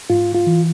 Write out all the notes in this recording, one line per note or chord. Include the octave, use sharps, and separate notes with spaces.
G#2 F4
F4
E3